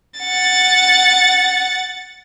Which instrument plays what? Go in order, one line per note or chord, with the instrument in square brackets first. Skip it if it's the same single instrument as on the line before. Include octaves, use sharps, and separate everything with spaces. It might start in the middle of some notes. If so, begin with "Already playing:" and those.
[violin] F#5 A6